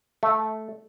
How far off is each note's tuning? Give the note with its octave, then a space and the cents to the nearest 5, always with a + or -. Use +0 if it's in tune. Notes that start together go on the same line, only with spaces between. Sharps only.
A3 -10